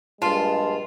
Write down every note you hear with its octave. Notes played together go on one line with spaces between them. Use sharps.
A#1 G2 G#3 F4 A5